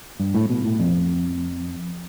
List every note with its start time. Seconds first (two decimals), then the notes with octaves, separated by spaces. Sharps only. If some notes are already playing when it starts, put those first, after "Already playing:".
0.19 G2
0.34 A2
0.50 B2
0.65 A2
0.79 F2